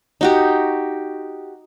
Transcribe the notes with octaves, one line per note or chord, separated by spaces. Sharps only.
D#4 F#4 G4